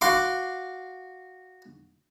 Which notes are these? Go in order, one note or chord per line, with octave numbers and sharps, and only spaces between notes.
F#4 F5 C6 D6